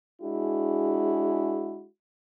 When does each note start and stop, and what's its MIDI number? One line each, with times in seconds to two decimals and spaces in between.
0.22 1.85 56
0.22 1.85 62
0.22 1.85 64
0.22 1.85 66
0.22 1.85 68